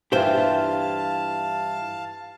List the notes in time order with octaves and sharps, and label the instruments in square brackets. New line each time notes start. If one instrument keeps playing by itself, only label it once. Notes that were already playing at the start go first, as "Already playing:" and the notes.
[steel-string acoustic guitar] G2 E3 F4 [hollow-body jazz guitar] G4 C5 [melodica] F5 A5